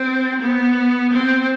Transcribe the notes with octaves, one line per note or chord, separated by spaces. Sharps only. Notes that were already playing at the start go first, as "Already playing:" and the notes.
Already playing: C4
B3
C4